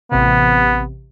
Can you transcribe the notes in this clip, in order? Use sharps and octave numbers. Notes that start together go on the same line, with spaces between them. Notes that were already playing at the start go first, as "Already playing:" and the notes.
A1 C3 B3